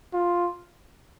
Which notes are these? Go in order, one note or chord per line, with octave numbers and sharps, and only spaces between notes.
F4